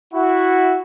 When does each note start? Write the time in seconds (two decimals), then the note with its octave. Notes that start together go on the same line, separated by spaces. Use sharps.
0.12 E4 F#4